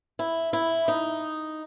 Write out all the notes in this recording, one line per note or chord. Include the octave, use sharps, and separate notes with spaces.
E4
E4
D#4